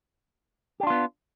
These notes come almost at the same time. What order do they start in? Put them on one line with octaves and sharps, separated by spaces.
G4 D4 F4 B3